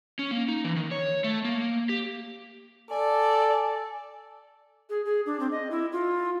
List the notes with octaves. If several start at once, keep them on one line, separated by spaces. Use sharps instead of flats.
C#4
A#3
D#4
E3
D#3
C#5
A3
A#3
G4
A4 D5 G#5
G#4
G#4
D4
C4
D#5
E4
F4